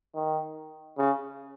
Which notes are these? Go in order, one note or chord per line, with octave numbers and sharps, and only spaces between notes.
D#3
C#3